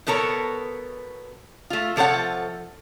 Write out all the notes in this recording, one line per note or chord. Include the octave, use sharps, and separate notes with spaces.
B2 B3 A4 A#4 C#5
A3 F4
C3 F3 A4 C#5 F#5